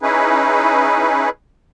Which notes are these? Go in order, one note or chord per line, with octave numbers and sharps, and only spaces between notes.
C#4 D#4 E4 G#4 B4